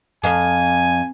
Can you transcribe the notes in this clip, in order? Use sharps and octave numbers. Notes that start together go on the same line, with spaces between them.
F2 G#5